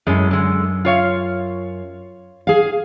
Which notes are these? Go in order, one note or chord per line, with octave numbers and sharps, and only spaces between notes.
F#2 A2 G#3 C#4
D3 G#3
F4 C#5 F5
G#4 F5